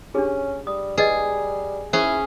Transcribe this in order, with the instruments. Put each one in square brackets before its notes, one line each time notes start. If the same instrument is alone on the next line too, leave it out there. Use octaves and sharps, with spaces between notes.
[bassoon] C#4 [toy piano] D4 G4 G#4
[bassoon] G3 [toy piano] D#6
[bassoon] G3 [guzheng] G#4 [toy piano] B4 D#5
[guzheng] C#4 G#4 [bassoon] E4 [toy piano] C5